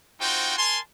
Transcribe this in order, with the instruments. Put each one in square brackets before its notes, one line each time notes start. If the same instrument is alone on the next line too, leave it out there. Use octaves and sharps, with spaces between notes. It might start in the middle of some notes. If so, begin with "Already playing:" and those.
[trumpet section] C4 D#4 F4 F#4 C5 G5
A#4 G#5 A5 C6